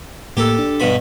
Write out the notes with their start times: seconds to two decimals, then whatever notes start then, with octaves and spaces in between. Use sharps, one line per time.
0.37 A2 A#3 G4 A4
0.59 D4
0.80 G2 B2 B5